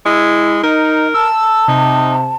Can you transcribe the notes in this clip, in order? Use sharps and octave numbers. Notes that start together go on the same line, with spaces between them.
G#3 E4
D#4 A#4 D#5
A5 E6
C3 D#4